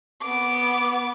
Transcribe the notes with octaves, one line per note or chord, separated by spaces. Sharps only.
B3 D6